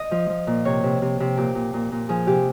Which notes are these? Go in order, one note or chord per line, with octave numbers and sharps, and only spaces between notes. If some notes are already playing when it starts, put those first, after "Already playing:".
Already playing: D#5
F3
F3
A#2
C3 C#5
C3
C3
C3
A#2 G4
A#2
A#2
A#2
F3 G#4
C3 G4